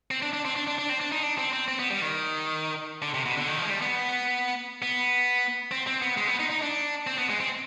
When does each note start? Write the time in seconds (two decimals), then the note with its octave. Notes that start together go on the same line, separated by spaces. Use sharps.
0.11 C4
0.22 D4
0.33 D4
0.45 C4
0.56 D4
0.67 D4
0.78 D4
0.89 C4
1.01 D4
1.12 D#4
1.23 D4
1.38 C4
1.53 C4
1.68 C4
1.79 B3
1.91 G3
2.02 D#3
3.02 D3
3.14 C3
3.26 B2
3.37 D3
3.48 D#3
3.58 F3
3.65 G#3
3.70 G3
3.82 B3
4.82 B3
5.71 C4
5.87 C4
6.02 B3
6.17 G#3
6.28 B3
6.40 D#4
6.50 D#4
6.62 D4
7.07 C4
7.18 B3
7.29 G#3
7.40 C4